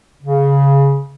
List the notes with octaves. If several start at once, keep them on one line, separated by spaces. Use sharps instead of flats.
C#3